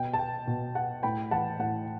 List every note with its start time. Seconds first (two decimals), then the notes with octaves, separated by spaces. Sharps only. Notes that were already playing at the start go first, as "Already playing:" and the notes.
Already playing: B2 G5
0.13 A5
0.19 G5
0.47 B2
0.75 F#5 A5
1.03 A2 G5 B5
1.31 E3 F#5 A5
1.59 A2 F#5